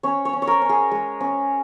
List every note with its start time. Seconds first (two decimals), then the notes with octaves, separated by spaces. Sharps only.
0.03 C#4 C#5
0.25 C#5
0.33 C#4
0.42 C#5
0.47 A#4
0.62 C#4
0.69 G#4
0.91 G#3
1.21 C#4